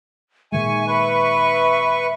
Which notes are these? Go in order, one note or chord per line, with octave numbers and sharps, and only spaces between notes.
A#2 D#3 G#3 E5 G#5 C#6
B4 E5 C#6